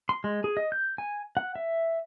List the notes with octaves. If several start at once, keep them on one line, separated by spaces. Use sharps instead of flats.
C6
G#3
G#4
D#5
G6
G#5
F#5
E5